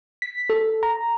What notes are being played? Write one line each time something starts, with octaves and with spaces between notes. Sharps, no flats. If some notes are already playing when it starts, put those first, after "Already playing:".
B6
A4
A#5